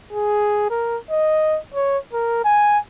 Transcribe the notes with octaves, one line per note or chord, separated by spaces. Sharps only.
G#4
A#4
D#5
C#5
A#4
G#5